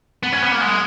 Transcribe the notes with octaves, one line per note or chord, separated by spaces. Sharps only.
B3
C#4
B3
A#3
G#3